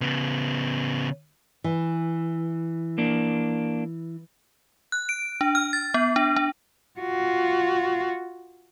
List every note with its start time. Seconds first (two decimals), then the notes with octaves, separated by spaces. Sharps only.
0.01 C#3 B3
1.64 E3
2.98 A#3 D4
4.92 F#6
5.09 D7
5.41 D4
5.55 F6
5.73 A6
5.94 B3
6.16 D4
6.36 D4
7.00 F4 F#4